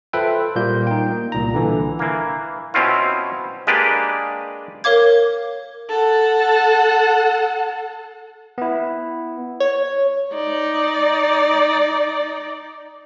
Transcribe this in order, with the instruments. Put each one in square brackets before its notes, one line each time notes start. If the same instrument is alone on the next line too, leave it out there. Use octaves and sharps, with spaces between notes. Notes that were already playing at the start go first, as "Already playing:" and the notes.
[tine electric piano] F4 A4 B4 C5 E5 G5
A#2 G3 A#3 F4 G6
D#4 G5
A#3
C2 A#2 A#5
D3 E3
[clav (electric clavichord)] E3 A#3
B2 C4 C#4 E4 F4
G#3 A#3 D4 G4 B4 D5
[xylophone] A#4 C#5 F5 D6 G#6
[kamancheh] A4 F#5
[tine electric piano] B3 E4
[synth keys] C#5
[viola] D#4 D5